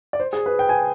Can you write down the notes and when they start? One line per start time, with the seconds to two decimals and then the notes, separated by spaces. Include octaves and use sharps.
0.13 D5
0.20 C5
0.33 G#4
0.46 B4
0.59 G5
0.69 G#5